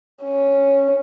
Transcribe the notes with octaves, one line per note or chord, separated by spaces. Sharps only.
C#4